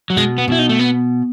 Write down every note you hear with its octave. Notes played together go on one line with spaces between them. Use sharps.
F#3
B2 G#3
B3
B2 E4
D#4
A3
B3